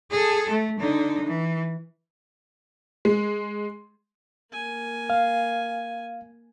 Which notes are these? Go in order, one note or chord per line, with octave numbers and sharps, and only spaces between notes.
G#4 A4
A3
D3 D#4
E3
G#3
A#3 G#5
F5